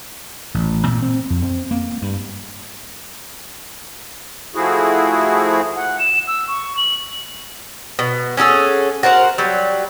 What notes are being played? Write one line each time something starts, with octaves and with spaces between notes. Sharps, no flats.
A1
A#2
C4
F2
C4
A#3
G2
F3 A3 E4 F#4 G#4
F#5
E7
E6
C#6
F#7
B2
C#4 F#4 G#4 A4
F#4 A#4 C5 F#5
F#3 G3